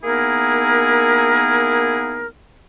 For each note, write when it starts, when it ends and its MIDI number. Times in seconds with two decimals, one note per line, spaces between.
0.03 2.26 58
0.03 2.26 59
0.03 2.26 63
0.03 2.26 64
0.03 2.26 68
0.03 2.26 70